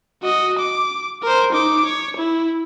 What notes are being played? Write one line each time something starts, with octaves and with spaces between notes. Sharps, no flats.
F#4 D#5
D6
A#4 C5
D#4 D6
C#5
E4